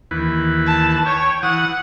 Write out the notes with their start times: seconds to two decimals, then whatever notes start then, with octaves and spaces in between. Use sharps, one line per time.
0.11 D#2 E3 B4
0.66 A5
1.06 C#5 G5
1.43 E3 F#5 D#6